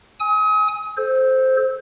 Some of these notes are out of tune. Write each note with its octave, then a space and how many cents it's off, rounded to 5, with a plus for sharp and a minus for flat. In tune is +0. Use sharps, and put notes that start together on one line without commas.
G#5 +0 D#6 +40
A4 -20 C5 +0